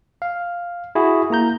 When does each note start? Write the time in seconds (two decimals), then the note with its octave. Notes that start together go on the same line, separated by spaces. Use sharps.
0.22 F5
0.95 E4 F#4 G#4
1.30 A#3 E4 A#5 G6